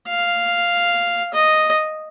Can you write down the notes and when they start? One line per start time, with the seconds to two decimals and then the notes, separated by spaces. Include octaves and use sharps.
0.08 F5
1.34 D#5